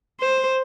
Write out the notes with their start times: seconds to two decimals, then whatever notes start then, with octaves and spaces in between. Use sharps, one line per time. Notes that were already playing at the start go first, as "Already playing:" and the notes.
0.20 C5